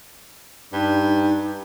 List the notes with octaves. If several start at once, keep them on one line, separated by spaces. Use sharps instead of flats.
G2 D#4